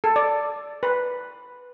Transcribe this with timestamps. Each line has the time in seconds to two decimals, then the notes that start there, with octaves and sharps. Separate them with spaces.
0.04 A4
0.16 D5
0.83 B4